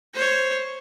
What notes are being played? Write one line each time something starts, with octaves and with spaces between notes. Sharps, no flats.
C5 C#5